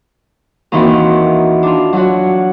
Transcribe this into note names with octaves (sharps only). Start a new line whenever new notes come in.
D#2 D#3 E3 C4 F#4
D4 F4
F#3 F#4